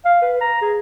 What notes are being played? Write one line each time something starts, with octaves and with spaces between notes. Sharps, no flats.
F5
B4
A#5
G#4